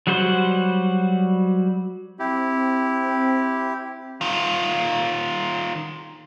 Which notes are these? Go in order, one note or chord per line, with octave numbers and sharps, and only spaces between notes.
F#3 G3 F#4 C5
C4 E4 G4
D#3 F4